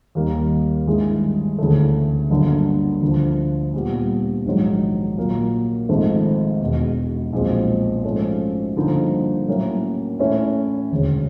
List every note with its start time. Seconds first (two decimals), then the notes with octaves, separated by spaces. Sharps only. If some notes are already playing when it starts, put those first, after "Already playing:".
0.15 D#2 D#3 G3 A#3
0.86 G#1 G2 E3 G#3
1.59 D2 C#3 E3 A3
2.30 G1 G2 D3 F#3 A#3
3.02 D2 D3 F3
3.74 A#2 G3 B3
4.45 A#1 G#2 D#3 F#3
5.17 A#2 F#3 A#3
5.89 G#1 G#2 F3 A3 C4
6.60 E1 E2 B2
7.33 B1 A#2 F3 G#3 C4
8.04 G#2 F3 A3 C#4
8.76 G2 D3 F3 A#3 D#4
9.48 A2 F#3 A#3 C#4 E4
10.19 A2 E3 A3 C#4 E4
10.91 E1 D2 C#3